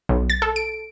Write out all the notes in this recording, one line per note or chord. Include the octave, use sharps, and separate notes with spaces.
B1
A6
A4
D7